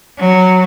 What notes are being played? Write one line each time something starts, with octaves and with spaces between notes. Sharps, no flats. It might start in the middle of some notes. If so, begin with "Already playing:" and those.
F#3